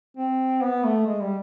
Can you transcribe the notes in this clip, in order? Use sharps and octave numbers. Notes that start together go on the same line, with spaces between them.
C4
B3
A3
G#3
G3